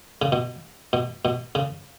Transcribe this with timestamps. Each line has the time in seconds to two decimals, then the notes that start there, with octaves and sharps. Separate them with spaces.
0.22 C#3
0.32 B2
0.93 B2
1.25 B2
1.55 C#3